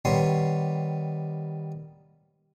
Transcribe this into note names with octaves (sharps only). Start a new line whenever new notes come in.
D#3 G3 B3 C#5 C6